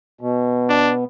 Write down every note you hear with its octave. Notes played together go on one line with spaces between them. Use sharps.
B2
D4